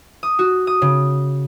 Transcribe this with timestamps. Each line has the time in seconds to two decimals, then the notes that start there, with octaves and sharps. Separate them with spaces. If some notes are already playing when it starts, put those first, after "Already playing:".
0.23 D#6
0.39 F#4
0.67 D#6
0.82 C#3